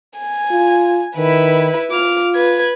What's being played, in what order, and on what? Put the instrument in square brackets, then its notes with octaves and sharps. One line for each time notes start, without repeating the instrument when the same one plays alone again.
[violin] G#5
[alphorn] F4
[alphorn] D#3 [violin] E4 B4
[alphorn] F4 [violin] D6 F6
[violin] B4 G#6